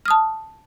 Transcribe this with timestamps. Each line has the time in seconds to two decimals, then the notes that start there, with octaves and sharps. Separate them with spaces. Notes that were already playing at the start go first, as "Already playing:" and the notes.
0.06 F6
0.08 D#6
0.11 A5